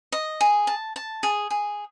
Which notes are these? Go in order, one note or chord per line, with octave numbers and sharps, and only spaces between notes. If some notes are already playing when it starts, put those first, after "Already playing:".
D#5
G#4
A5
A5
G#4
G#4